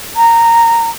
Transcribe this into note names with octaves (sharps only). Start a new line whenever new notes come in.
A#5